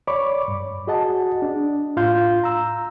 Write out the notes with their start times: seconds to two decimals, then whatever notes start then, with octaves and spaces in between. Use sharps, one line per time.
0.07 C#5 D5 B5 C#6 D6
0.48 G2
0.87 F#4 G#4 D#5 F#5 A5
1.42 D4
1.97 A2 F4 F5 C6 G6
2.44 A#5 E6